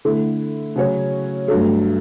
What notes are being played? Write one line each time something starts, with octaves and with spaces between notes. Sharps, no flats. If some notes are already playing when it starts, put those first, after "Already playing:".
D3 A3 E4
C#3 F#3 C#4 F#4 C#5
G2 F#3 A3